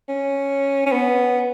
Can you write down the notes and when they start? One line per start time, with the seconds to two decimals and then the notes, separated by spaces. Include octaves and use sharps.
0.09 C#4
0.86 C#4
0.92 B3